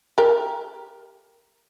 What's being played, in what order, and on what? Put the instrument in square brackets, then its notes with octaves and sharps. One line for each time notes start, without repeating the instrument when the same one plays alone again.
[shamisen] G4 A#4